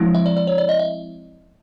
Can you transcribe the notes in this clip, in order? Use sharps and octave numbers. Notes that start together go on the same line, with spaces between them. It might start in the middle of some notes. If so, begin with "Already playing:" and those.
Already playing: F3 G#3 C4 E4
E5
D5
D5
C#5
D5
D#5
E5